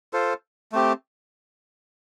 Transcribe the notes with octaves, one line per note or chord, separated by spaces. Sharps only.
F4 A4 C5
A3 C4 G4